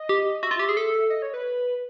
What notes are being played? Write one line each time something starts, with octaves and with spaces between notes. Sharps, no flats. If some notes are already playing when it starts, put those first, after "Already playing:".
Already playing: D#5
G4
F#4 E5
F4
G4
G#4
A4
D#5
C#5
B4